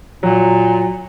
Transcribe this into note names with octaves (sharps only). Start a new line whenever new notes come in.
A#2 F#3